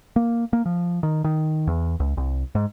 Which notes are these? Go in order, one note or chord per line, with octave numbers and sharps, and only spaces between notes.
A#3
A#3
F3
D#3
D#3
E2
C#2
C2
G#2